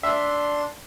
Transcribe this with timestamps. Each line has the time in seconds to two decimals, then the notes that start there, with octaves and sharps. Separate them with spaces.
0.03 D4 E5 C6